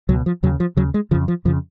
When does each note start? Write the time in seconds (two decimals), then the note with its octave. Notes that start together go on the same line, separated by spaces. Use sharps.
0.09 C#2 B2 F#3
0.26 F3
0.43 D#2 C#3 F#3
0.60 F3
0.77 D#2 C#3 F#3
0.94 G#3
1.11 C#3 F3
1.14 F2
1.28 F3
1.45 F2 C#3 F3